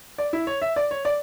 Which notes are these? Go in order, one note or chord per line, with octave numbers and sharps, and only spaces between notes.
D5
E4
C#5
E5
D5
C#5
D5